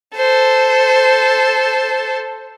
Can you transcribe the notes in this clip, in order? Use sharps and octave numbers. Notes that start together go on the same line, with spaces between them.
A4 C5